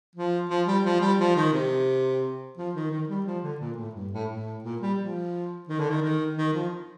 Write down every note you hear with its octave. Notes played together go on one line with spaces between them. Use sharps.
F3
F3
G3
F3
G3
F3
D#3
C3
F3
D#3
D#3
G3
F3
D3
A#2
A2
G2
A2
A2
A#2
G3
F3
D#3
D3
D#3
D#3
D#3
F3